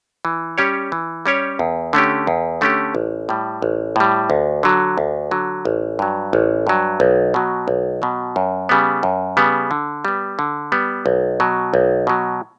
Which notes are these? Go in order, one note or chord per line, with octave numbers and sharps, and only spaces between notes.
E3
G3 C#4 G4 C#5
E3
G3 C#4 G4 C#5
E2
D3 A3 C#4 G4
E2
D3 A3 C#4 G4
A1
A2 G3
A1
A2 G3
D2
D3 F#3
D2
D3 F#3
A1
G2 F#3
A1
G2 F#3
B1
B2 F#3
B1
B2 F#3
F#2
C#3 G3 B3
F#2
C#3 G3 B3
D3
G3 B3
D3
G3 B3
B1
B2 F#3
B1
B2 F#3